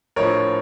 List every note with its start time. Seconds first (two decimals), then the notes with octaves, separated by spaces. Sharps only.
0.16 A#1 A2 F3 A#4 C#5